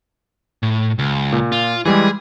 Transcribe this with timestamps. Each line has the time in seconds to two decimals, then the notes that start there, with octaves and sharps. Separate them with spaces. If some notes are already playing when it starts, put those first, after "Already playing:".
0.63 A2
0.99 C#2
1.32 A#2
1.52 F4
1.85 E3 G3 G#3 G#4